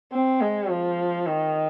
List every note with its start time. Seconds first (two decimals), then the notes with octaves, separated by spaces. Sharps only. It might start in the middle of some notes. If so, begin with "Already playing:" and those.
0.13 C4
0.41 G#3
0.70 F3
1.26 D#3